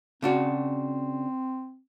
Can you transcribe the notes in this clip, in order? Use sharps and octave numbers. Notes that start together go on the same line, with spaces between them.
C#3 C4 D4 F#4